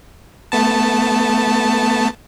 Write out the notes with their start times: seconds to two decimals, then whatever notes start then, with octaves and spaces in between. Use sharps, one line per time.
0.52 A3 B3 A5